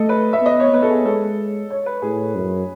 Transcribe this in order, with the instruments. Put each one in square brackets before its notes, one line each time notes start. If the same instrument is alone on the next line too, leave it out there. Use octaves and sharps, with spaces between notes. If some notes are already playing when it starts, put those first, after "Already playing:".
Already playing: [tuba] A3 [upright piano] A4 D#5
[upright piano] B4
E5
[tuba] B3 [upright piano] D#5
[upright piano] C#5
[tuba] B3 [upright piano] B4
[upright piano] A4
G#4
[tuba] G#3 [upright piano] A4
[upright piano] C#5
B4
[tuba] A2 [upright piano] G#4
[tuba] F#2